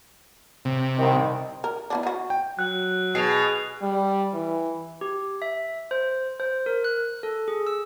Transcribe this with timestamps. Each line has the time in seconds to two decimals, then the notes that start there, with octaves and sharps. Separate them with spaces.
0.65 C3
0.97 C2 D#3
1.64 A#4
1.90 E3 B3 D4
2.03 D#4 F#4
2.30 G5
2.59 F#3 F#6
3.15 B2 G#4 C7 F7
3.82 G3
4.34 E3
5.01 G4
5.42 E5
5.91 C5
6.40 C5
6.66 A#4
6.84 F#6
7.23 A4
7.48 G#4
7.67 E6